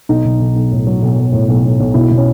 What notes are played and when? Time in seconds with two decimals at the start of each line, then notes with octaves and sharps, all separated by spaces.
0.09 B1 D#4
0.25 B1
0.40 B1
0.56 B1
0.71 A2
0.87 F#3
1.02 B1
1.18 B1
1.32 A2
1.49 B1
1.64 B1
1.80 B1
1.94 B2 E4
2.11 B2
2.17 C#4